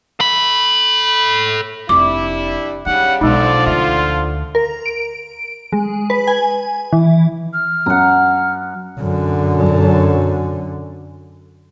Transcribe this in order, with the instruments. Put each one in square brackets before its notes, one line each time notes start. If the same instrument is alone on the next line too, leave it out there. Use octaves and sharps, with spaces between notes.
[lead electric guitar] A4 B5
[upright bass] F1 [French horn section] G3 D4 E4 [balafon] D6
[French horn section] C#3 G3 [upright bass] D#4 [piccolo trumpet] F#5
[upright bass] B1 [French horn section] D3 F3 [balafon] G#3 D#4 [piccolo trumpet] D5
[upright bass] D2 [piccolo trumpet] F4 [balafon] E5
[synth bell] A#4
D7
G#3
B4
G#5
E3
[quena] F6
[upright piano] F#2 [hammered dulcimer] F#5 A#5
[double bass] F#2 D3